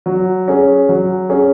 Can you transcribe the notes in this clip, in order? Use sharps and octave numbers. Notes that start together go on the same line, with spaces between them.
F#3
C#4 G#4
F#3
C#4 G#4